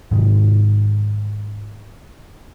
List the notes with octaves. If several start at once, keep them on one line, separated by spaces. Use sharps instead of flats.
G#2 C3 D#3 G#3